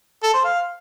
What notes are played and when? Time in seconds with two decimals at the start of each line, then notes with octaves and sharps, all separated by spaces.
0.23 A4
0.34 C5
0.44 F5